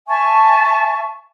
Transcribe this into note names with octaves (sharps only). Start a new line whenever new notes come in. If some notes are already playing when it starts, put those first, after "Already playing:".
E5 G#5 A5 C#6